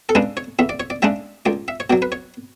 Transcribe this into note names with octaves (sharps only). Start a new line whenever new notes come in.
A4
C#3 G#3 D4 B4
C#5
E2 E5
D5
C#5
D5
C#3 G#3 D4 E5
C#2 D5
E5
C#5
B2 F#3 D5
B4
C#5